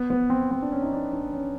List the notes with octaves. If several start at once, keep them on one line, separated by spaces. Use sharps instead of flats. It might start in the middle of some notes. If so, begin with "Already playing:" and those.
Already playing: B3
B3
C4
C4
D4
C#4
D#4
D4
D4
C#4